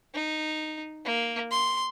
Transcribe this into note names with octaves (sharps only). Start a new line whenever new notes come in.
D#4
A#3
C6